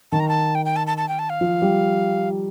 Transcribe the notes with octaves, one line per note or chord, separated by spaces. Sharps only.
D#3 A5
A#5
A5
G5
G5
A5
A5
A5
G5
A5
F5
F3
G3